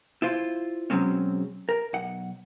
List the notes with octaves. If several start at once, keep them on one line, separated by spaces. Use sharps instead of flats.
E4 F4 C5
B2 F#3 G#3 C4 C#4
A#4
B1 F#5